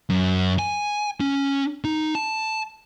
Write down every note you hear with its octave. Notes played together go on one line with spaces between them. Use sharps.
F#2
G#5
C#4
D#4
A5